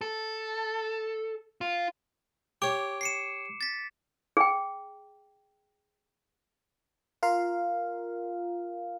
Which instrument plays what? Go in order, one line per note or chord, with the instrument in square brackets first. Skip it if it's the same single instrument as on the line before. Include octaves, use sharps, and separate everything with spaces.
[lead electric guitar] A4
F4
[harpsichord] G4 C#5 [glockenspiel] D6 D7
[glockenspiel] C7 C#7 E7
A6 B6
[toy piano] G#4 G5
[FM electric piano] F4 A#4 F5